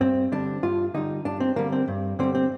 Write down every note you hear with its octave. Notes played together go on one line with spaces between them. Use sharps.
G2 C4
D3 G3 D4
G2 F4
D3 G3 D#4
G2 D4
C4
D3 G3 A#3
C4
G2
D3 G3 C4
C4